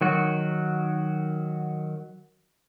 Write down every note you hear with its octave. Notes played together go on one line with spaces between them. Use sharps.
D#3 F#3 F#4